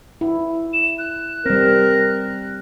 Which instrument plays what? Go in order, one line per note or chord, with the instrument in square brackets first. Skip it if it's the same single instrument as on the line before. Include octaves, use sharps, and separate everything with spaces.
[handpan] E4
[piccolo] E7
F#6
[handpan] G3 C4 [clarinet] A#4